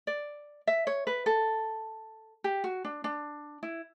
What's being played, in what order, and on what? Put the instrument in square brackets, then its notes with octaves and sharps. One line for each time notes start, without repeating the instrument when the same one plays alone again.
[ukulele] D5
E5
C#5
B4
A4
G4
F#4
D4
D4
E4